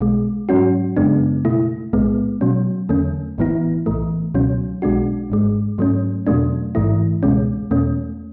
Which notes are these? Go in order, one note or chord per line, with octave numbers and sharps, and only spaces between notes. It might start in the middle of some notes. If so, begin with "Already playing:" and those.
B1 B2 G#3
G#2 F#3 C#4 F#4
F#2 C#3 G#3 B3 D4
B2 A3 E4
B1 A2 G#3 B3
B2 F#3 C#4
E2 D3 A3 C#4
A1 A2 E3 B3 E4
B1 A2 E3 A3
C#2 B2 F#3 C#4
B1 B2 G#3 D4 F#4
G#1 G#2 G#3
G#2 F#3 A3 C#4
E2 B2 F#3 A3 D4
A1 G#2 E3 A3 E4
C#2 B2 G#3 C#4
E2 B2 A3 C#4